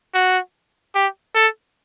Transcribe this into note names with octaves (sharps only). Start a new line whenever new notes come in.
F#4
G4
A4